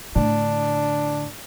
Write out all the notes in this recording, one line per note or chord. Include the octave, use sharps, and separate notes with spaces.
A2 D3 D4